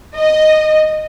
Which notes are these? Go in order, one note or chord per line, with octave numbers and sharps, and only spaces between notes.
D#5